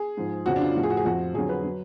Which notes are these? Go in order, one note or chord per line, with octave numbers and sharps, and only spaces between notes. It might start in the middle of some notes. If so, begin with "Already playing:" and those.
Already playing: G#4
G#2 F3
F2 C#3 F3 F#4
D4
F4
A2 F3 F#4
G#4
F#4
G#4
F2 F3 F#4
F2 D3 F#3 G#4
B4
F#3